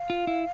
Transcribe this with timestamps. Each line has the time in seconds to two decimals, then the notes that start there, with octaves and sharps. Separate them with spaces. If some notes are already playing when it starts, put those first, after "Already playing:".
Already playing: F5
0.10 F4
0.27 E4